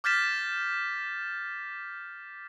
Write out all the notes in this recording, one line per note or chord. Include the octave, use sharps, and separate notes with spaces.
D6 F6 G6 A6 B6 E7